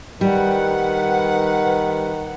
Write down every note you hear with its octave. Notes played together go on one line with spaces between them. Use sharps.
D#3 G3 B4 F#5